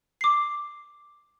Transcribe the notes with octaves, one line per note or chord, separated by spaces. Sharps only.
D6 C7